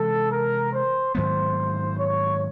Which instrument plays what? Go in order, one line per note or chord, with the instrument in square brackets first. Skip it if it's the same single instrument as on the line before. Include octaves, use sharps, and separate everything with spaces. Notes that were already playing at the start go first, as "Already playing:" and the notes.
Already playing: [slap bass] C3 E3 G#3 [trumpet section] A4
[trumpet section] A#4
C5
[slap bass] G#2 D#3 F#3 B3 [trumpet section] C5
[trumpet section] C#5